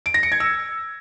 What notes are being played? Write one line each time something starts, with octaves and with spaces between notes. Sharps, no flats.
D7
A#6
C#7
G#6
E6